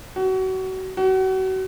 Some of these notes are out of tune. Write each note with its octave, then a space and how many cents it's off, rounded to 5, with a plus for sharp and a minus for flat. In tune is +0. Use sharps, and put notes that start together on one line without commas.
F#4 +30
F#4 +35